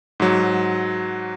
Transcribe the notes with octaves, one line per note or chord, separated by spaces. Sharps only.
G#2 F#3